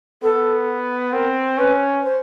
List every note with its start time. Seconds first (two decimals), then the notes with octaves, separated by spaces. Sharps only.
0.22 B3 A4
1.12 C4 A#4
1.57 C#4 B4
2.03 C5